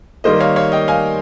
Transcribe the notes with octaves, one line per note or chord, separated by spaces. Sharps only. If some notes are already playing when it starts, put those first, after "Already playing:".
D#3 G3 A#3 C5 D#5
C#5 F5
C#5 F5
D#5 G5
F5 G#5